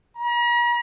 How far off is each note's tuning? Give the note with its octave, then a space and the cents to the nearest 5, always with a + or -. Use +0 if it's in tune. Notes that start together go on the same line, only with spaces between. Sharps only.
A#5 +45